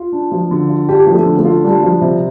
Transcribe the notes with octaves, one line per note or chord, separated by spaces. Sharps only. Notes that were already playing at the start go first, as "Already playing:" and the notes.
Already playing: F4
D4
F3
D3
F4
D4 G4
F3
A3
D3
A3
F4
G3 D4
F3
C3